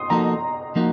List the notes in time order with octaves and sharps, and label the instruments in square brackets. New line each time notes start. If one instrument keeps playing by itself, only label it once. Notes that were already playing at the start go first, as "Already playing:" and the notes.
Already playing: [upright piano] C6 D#6
[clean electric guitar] F3 A#3 D#4 F#4 A4 [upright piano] A#5
[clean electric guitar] F3 A#3 D#4 F#4